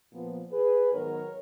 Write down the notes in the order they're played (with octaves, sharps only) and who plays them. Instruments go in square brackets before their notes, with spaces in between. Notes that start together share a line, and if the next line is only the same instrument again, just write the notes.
[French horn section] A#2 F3 B3
G#4 B4
G#2 D#3 F#3 B3 A#4 C#5